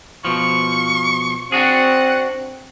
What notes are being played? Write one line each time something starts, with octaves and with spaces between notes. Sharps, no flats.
B2 F3 C#6
C4 D4 F#4 G#4 F#5